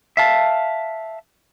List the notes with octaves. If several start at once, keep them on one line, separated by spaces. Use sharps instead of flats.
E5 F5 A5